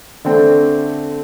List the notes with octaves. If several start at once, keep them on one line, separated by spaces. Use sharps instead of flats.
D3 A3 C4